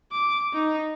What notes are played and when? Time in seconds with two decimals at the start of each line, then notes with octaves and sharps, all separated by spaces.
0.12 D6
0.53 D#4